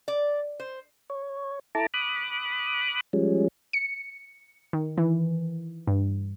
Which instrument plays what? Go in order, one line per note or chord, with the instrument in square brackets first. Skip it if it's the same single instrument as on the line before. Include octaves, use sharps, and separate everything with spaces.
[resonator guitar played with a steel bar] D5
C5
[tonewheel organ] C#5
E4 A4 A5 A#5 D6
B5 D6 D#6 F#6
F3 G3 G#3 C#4
[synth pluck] C#7
D#3
E3
G2